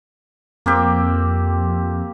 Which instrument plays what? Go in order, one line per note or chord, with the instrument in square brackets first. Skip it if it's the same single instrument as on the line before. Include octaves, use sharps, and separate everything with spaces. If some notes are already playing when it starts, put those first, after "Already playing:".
[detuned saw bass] F2 [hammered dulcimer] A#3 C4 G4